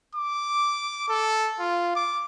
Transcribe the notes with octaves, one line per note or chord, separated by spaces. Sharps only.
D6
A4
F4
D6